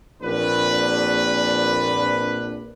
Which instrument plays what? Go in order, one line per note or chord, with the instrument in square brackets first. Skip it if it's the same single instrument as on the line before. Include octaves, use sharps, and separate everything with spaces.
[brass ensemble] A#1 C4 D4 B4